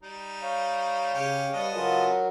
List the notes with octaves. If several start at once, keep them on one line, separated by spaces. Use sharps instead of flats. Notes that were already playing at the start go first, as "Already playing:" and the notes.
G3 D#4
C#5 F5
C#3 C#4 G4
G3 B3 D#5 A5
C#3 F#3 F4 F#4 G#4 A#4